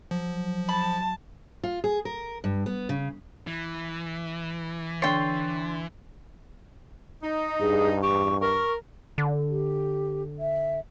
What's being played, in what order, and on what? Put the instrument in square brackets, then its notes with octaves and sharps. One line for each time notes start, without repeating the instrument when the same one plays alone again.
[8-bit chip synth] F3 [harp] F#3
[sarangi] A5 [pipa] B5
[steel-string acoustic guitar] F4
G#4
A#4
G2
B3
C#3
[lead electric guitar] E3
[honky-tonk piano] D3 C7 [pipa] C#5 G5 [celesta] C6 A6
[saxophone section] D#4
[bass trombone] G2 [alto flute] G#4
[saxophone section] E2 G4 [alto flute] C#6
[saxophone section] A#4 [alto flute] C#6
[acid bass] D3
[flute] G4
E5